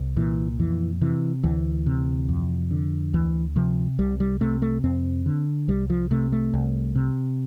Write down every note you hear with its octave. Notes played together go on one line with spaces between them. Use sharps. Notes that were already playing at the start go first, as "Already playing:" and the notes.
Already playing: C2
A#2 E3
F2 E3
C3 E3
D2 E3
C3
F2
D3
D2 E3
C3 F3
C2 G3
G3
C3 A3
A3
F2 C4
D3
C2 G3
F3
C3 A3
A3
C2
C3